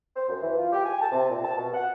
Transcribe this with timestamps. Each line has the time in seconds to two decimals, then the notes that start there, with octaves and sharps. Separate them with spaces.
0.16 C5
0.29 F#2
0.42 E3
0.57 F4
0.72 G4
0.84 G#5
1.01 A5
1.12 C3
1.30 A#2
1.44 A5
1.57 B2
1.74 F#5